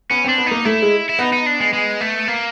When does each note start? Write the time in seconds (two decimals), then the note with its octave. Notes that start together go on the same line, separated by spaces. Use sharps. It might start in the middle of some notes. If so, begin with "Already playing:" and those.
0.10 B3 C#4
0.25 C4 D4
0.38 B3
0.46 A#3 D#4
0.65 A3 E4
0.82 G#3
1.09 E4
1.19 B3 D#4
1.33 D#4
1.46 D4
1.60 G#3
1.73 G#3
2.01 A3
2.28 A#3